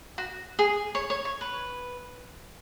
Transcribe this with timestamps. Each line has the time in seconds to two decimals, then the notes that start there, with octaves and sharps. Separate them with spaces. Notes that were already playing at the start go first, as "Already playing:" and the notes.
0.18 F#4
0.59 G#4
0.95 C#5
1.10 C#5
1.25 C#5
1.41 B4